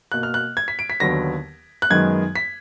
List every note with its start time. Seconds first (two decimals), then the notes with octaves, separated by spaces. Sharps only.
0.12 B2 A#3 F#6
0.23 F6
0.34 F#6
0.57 G#6
0.68 B6
0.79 D7
0.90 B6
1.00 D#2 D3 F#3 B3 A#6
1.82 F#6
1.90 F#2 D#3 G#3 B3 G#6
2.36 B6